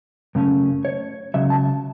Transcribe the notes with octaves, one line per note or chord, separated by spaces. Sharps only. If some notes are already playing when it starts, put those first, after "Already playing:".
F#2 C#3 A3 C#4
C#5
C#2 C#3 F#3 E5
A5